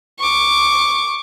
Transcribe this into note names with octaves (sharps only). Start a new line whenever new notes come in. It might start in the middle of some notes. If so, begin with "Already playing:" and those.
C#6 D6